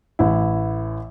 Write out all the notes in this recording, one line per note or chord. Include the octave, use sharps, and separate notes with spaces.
A1 E4